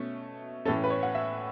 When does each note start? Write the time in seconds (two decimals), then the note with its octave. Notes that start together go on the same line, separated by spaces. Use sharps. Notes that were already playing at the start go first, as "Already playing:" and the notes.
Already playing: B2 A3 C#4
0.65 A2 E3 C#4 A4
0.84 B4
0.90 C#5
1.03 F#5
1.15 E5